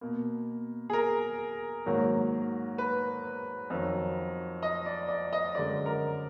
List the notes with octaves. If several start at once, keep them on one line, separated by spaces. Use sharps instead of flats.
B2 A#3
G#4
A#4
G#2 D#3 F#3 A#3
B4
F2 D#3 F#3
D#5
D5
D5
D#5
F#2 D3 G#3 D5
A#4